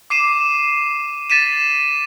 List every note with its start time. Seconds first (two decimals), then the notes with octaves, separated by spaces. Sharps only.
0.10 D6 C7 D#7 E7
1.30 A6 B6 D#7 E7